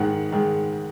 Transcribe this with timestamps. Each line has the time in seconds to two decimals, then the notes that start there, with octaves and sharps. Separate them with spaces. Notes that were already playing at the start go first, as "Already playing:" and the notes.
Already playing: G#2 D#3 G#3 F#5
0.32 G#2 D#3 G#3